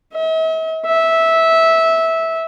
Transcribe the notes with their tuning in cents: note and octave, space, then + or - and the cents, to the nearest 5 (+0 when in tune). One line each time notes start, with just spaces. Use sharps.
E5 -45
E5 -15